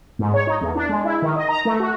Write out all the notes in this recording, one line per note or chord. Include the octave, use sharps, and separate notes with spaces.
G#2
C#5
D#4
E2
D4
G#3
E4
D#3
D#5
A#5
A3
F#4